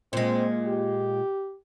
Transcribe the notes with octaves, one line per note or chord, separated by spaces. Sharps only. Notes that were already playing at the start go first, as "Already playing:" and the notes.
A#2 G#3 C4
G4